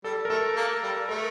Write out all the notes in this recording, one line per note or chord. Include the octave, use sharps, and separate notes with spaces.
G3 A4
A#4
A3 A4
A#3
G3
A3 A#4